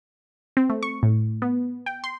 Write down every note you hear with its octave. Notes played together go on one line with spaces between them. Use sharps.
C4
A3
C#6
A2
B3
G5
C6